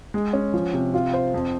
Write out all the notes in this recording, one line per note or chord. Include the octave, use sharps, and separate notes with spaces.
G#3
C#4
F3
C3
F4
C5
F2